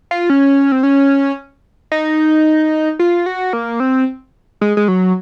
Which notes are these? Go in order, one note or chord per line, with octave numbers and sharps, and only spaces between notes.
F4
C#4
C4
C#4
D#4
F4
F#4
A#3
C4
G#3
G#3
F#3